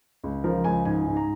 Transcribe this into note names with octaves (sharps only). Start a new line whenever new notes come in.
C#2
F3 A#4
C#2 G#5
G#2 G#5
G#2
A#5